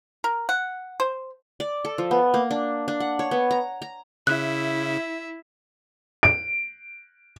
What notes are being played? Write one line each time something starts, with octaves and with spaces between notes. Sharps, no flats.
A#4
F#5
C5
D5
A4
F3
B3
A#3
D4
D4
F#5
C#5
B3
A#5
A#5
C#3 E4 E5 F#6
D7